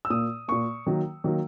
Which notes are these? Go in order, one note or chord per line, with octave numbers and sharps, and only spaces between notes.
E6
A#2 A#3 D#6
A#2 A#3 C#6
D#3 F#3 A#3
D#3 F#3 A#3